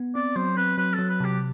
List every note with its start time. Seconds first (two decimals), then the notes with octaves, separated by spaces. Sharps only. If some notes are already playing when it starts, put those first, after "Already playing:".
Already playing: B3
0.15 C4 D5
0.36 F#3 C5
0.57 C4 B4
0.78 F#3 B4
0.94 F#3 A4
1.09 B4
1.20 C3 G4